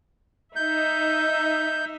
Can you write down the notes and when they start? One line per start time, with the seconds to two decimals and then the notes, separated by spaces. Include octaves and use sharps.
0.56 D#4 E5 G6